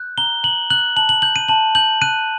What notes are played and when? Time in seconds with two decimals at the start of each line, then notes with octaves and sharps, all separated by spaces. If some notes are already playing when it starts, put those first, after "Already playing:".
Already playing: F#6 G6
0.18 A#5 G7
0.44 A#5 F#7
0.70 F#6 F#7
0.96 A5 F#7
1.09 F#7
1.22 G6 F#7
1.36 D#7
1.48 A5 F#7
1.75 G6 F#7
2.02 F#6 D#7